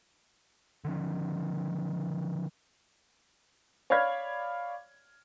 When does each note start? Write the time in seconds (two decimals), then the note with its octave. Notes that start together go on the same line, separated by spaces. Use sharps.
0.84 D3 D#3 F3 C#4
3.90 C#5 D5 F5 B5 F6 G#6